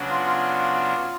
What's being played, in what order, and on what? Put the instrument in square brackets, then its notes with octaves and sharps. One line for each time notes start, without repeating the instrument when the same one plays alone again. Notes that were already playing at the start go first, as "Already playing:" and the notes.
Already playing: [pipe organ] C#3 F#3 B3 D4 F#4
[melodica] F4
F4